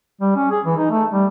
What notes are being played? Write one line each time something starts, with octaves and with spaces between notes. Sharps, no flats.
G3
C#4
G#4
E3
D#4
A3
G3